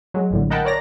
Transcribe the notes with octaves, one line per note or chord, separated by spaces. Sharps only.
F#3 G#3
A#1 A2 D3
A#4 D#5 F#5 G5 A5 B5
A#4 C#5 D5 A#5 A#6